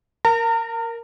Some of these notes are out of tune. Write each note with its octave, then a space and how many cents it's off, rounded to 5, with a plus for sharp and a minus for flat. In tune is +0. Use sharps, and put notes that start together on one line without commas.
A#4 +0 A#5 -40